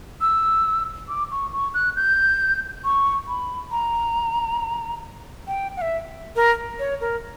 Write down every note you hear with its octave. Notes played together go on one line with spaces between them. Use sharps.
E6
D6
C#6
C#6
F#6
G6
C#6
B5
A#5
G5
F#5
E5
A#4
C#5
A#4